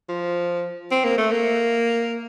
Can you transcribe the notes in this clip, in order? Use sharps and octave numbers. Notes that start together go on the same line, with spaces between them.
F3
C4
A#3
A3
A#3